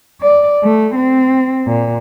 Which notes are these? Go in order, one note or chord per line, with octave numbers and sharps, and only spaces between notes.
D5
A3
C4
A#2